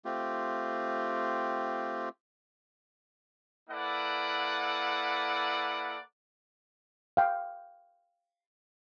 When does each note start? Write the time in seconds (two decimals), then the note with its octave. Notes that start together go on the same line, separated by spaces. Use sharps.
0.05 A3 C4 F4 G4
3.69 A#3 E4 A4 B4 D5 F#5
7.17 F5 G5